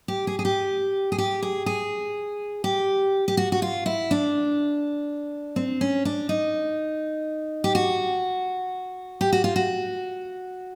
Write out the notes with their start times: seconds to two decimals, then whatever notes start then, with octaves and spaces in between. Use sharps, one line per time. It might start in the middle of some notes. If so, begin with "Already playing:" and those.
0.08 G4
0.27 G#4
0.39 G#4
0.45 G4
1.12 G#4
1.18 G4
1.43 G#4
1.66 G#4
2.64 G4
3.28 G4
3.37 F#4
3.52 F#4
3.62 F4
3.86 E4
4.11 D4
5.56 C4
5.81 C#4
6.05 D4
6.29 D#4
7.64 G4
7.75 F#4
9.21 G4
9.32 F#4
9.44 F4
9.56 F#4